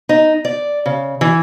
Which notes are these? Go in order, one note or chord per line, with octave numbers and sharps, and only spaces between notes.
D#4
D5
C#3
E3